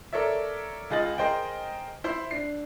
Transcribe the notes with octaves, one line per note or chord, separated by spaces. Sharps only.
A4 A#4 C#5 D5 E5
C#2 F4 G#4 D#5 A6 F#7
G#4 A#4 C5 D#5 G5
E4 C5 C6
D4 C7